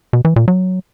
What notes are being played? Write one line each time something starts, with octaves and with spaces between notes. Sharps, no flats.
B2
E3
A#2
F#3